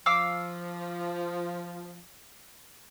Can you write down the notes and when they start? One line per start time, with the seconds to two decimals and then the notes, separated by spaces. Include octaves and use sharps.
0.06 F3 F5 D6 E6